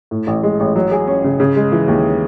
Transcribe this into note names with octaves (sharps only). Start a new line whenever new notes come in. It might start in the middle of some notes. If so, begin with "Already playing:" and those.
A2
A1
G#3
A1
F#3
G#4
C#4
C#3
C#3
G#3
E3
D#2